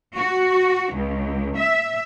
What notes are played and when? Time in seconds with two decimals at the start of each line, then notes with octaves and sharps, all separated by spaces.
0.17 F#4
0.93 C#2
1.57 E5